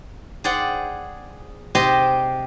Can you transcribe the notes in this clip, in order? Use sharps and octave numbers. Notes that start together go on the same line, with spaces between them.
G#4 C5 D5 F#5 G5
C3 G4 C5 D#5 C6